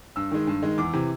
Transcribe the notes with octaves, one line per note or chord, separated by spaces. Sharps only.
G2 E6
D#3 G#3
G2
D#3 G#3
E2 D6
C3 E3